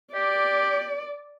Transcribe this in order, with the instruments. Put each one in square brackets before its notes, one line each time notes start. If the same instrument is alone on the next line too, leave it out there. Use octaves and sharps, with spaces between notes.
[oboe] G4 [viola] D5